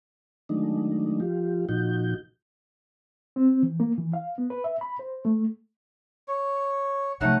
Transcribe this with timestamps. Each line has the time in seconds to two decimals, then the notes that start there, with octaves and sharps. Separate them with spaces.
0.49 D#3 F#3 G#3 A3 D4 D#4
1.20 F3 F4 G4
1.69 A#2 F3 D#4 F#4 G6
3.36 C4
3.63 E3
3.80 A#3
3.98 E3
4.13 F5
4.38 B3
4.50 B4
4.64 E5
4.81 B5
4.99 C5
5.25 A3
6.28 C#5
7.21 C3 F3 F#3 A3 D#4 F#5